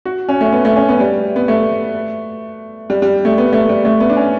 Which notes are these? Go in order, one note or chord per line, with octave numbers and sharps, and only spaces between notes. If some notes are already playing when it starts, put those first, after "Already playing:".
F#4
C#4
A3
B3
A3
C#4
B3
G3
B3
A3
G3
G3
A3
B3
A3
G3
A3
B3
D4
C#4